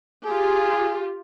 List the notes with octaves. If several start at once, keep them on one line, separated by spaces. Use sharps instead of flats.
F4 G4 G#4